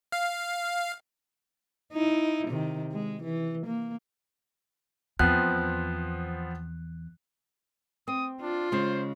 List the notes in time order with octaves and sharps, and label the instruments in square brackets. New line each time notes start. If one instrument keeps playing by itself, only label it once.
[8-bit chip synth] F5
[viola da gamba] D#4 E4
C3 D#3
G#3
E3
A#3
[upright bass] E2 [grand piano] F3 B3 C4 [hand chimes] F#6
[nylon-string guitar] C4 [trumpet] D#6
[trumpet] D4 [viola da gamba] F4
[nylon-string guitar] C#3 G#3 [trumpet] C5